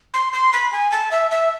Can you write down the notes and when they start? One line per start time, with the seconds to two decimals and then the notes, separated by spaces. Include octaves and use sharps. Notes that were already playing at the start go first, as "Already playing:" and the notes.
0.14 C6
0.33 C6
0.53 B5
0.72 G#5
0.92 A5
1.11 E5
1.31 E5